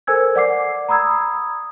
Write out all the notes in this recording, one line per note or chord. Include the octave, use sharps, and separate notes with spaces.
A4 A#4 C5 G#5 E6 G#6
D5 F#5 D6 C7
A#5 B5 D#6 E6 G#6